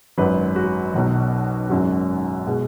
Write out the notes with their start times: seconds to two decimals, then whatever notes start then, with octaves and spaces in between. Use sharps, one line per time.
0.18 G#1 F#2 F#3 B4
0.56 F#4
0.94 B1 B2 F#3
1.70 G#1 F#2 C#3 F#3 F#4
2.47 B2 G#3